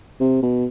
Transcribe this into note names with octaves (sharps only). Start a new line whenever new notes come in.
C3
B2